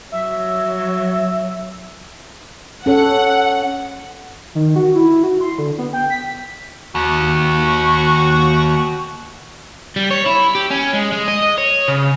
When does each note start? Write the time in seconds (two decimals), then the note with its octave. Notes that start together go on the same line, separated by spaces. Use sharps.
0.12 F#3 E5
2.86 C#4 A4 C#5 F#5
4.55 D#3
4.76 F#4
4.95 E4
5.07 E4
5.23 F#4
5.41 C6
5.58 D3
5.78 B3
5.93 G5
6.10 B6
6.95 D#2 F#4
9.96 G3
10.11 C#5
10.26 E4
10.55 G4
10.70 C#4
10.93 G#3
11.12 G#3
11.28 D#5
11.58 C#5
11.88 C#3